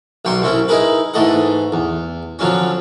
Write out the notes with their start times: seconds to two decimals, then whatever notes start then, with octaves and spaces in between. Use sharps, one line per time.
0.25 B1 F#3 G5 C6 C#6
0.42 C2 C4 C#4 E4
0.68 D#4 E4 G#4 A#4 B4
1.14 G#2 E3 A3 D#5 F#5
1.72 E2
2.39 D3 F3 F#3 C4 C#4